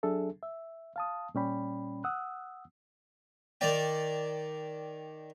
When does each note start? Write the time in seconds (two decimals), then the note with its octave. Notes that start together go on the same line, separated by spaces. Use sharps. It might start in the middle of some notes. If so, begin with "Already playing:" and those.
0.03 F#3 D4 G#4 A4 E5
0.42 E5
0.96 F5 A5 D#6
1.35 A#2 G3 C#4 D5 G5 B5
2.04 F#5 D#6 E6 F#6
3.61 D#3 D5 G5